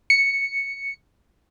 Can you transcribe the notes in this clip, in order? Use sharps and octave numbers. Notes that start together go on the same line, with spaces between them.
C#7